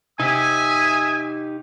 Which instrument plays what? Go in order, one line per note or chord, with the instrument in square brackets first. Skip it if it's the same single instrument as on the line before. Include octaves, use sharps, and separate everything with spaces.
[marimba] C3 [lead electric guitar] D#4 G4 [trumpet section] E5 G#5 [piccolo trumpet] D#6